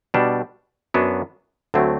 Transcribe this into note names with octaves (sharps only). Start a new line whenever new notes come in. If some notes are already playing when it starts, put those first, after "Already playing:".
B2 G3 D4
F#2 F#3 B3 D4
D2 D3 F#3 A3 C4